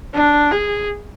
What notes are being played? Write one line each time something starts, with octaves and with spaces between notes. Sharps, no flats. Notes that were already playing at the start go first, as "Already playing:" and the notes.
D4
G#4